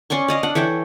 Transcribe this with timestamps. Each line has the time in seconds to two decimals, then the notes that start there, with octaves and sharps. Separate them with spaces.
0.10 C#4 D5 C6 C#6
0.28 D5 D#5 F5
0.43 D4 F#5
0.55 E3 A4 C#5 G5